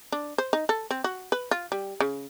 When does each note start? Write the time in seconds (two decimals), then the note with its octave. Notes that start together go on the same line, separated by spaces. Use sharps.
0.12 D4
0.38 C5
0.53 D#4
0.69 A4
0.91 C4
1.04 F#4
1.32 B4
1.51 F4
1.72 G3
2.00 C#3